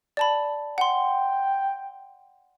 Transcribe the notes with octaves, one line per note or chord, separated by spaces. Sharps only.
D5 A5 B5
F#5 G5 C6